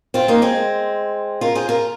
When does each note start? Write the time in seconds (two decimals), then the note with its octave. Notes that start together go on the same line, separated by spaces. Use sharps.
0.14 C4 F4
0.28 A#3 D#4
0.42 G#3 C4
1.41 F4 A#4
1.55 G#4 C5
1.69 F4 A#4